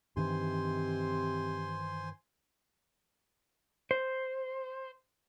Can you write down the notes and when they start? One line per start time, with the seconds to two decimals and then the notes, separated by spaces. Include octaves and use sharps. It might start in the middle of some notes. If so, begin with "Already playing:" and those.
0.16 G2 C3 D#3 E3 C5 G#5 C6
3.91 C5